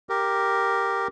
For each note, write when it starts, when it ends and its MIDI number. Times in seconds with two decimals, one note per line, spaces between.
0.09 1.08 67
0.09 1.08 70